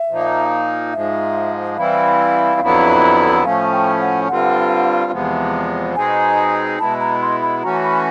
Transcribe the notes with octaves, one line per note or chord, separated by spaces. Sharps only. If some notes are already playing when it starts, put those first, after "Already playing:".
Already playing: E5
A#2 F3 A#3 D#4
G#2 F3 G#3 E5
E3 G3 C4 E4 F5
F2 D3 F#3 B3 E4
A2 F3 A3 C#4 F5
G5
F#5
G2 D3 G3 C4 F4 F#5
E2 C3 F3 G#3 B3
B2 G#3 C4 D#4 G#4 G#5
B2 G#3 B3 E4 A5
A#5
C6
B5
E3 A3 C#4 F#4 A#5
B5